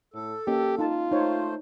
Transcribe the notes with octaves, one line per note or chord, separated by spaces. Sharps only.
A2 A4
A#3 C#4 G4 D#5
D#4 F4 A5
A3 D#4 C5 C#5